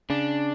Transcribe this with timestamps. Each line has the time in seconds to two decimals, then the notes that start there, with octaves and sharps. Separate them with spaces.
0.10 C#3 D4